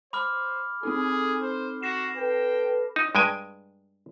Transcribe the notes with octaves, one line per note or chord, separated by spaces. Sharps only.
C5 B5 D6 F6
C4 D#4 G#4 A4
C5
F#4 A#6 C7 E7
A4 B4 G5
D#4
G2 G#3 G5 G#5